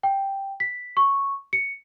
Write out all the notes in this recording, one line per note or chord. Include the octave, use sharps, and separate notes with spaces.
G5
B6
C#6
C#7